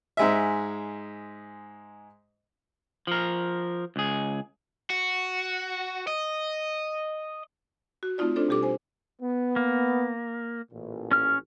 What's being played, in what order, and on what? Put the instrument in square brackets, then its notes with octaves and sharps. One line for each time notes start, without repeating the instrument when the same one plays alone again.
[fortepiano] G#2 G#3 E5
[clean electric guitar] F3 A#4
C#2 G#4
[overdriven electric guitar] F#4
D#5
[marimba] F#4
A3 C4 D#4 F4 D5
C4 D4 F4 A4 C5 D5
B2 G3 G4 A4 D6
C5 G#5
[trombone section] B3
[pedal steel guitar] A#3
[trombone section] A1 A#2
[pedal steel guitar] C#4 F6